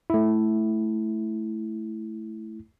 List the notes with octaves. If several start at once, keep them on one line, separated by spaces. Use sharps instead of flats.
A3 E4